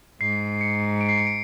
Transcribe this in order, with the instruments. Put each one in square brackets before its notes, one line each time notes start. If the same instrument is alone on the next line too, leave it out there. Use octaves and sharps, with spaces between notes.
[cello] G#2 [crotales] C7
[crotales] C#7
D7
C7
C#7
D7